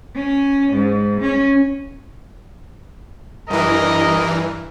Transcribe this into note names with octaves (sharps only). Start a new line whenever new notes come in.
C#4
G#2
C#4
G2 E3 A#4 D#5